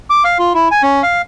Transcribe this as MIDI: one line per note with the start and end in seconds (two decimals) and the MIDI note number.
0.10 0.23 86
0.24 0.38 77
0.39 0.53 65
0.54 0.68 64
0.71 0.82 80
0.83 1.02 61
1.03 1.22 77